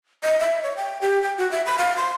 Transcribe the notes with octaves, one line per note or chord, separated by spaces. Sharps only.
D#5
E5
C#5
G5
G4
G5
F#4
E5
B5
F5
C6